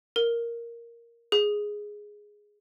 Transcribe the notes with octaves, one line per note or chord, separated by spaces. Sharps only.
A#4
G#4